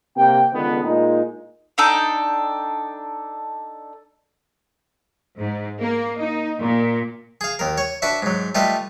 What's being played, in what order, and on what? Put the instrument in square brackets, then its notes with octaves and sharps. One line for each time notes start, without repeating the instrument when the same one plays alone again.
[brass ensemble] C3 A#3 G5
C#2 D3 D#3 B3
A#2 G#3 D#4
[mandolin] D4 D#4 A4 G5
[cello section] G#2
A#3
D#4
A#2
[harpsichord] G#4 F5
D#2 A#4
C#5
D4 F#4 B4 E5
G#2 F#3
G3 A3 F4 B4 D#5